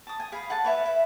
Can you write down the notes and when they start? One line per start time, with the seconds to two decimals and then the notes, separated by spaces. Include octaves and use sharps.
0.07 A5 D#6
0.20 G#5
0.32 G#4 F5 B5
0.50 F#5 G#5 A5
0.64 B4 C#5 E5
0.86 E5